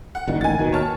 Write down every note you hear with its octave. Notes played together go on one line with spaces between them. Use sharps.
F#5
F#1 A#2 D#3
A1 D#3 G#5 A6
D#2 B2 D#3
C#5 A5 F6